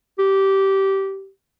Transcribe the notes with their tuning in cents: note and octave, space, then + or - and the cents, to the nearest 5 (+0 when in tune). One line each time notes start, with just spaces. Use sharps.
G4 -15